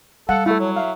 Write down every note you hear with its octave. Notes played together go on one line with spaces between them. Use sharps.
G3 A4 F5 F#5
A3 E4 A4
F#3 C#5
E5 F5